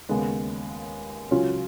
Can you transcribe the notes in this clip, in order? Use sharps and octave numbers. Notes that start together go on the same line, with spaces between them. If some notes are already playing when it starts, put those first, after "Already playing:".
D#2 C#3 G#3 B3
C#2 C#3 F#3 C#4 F4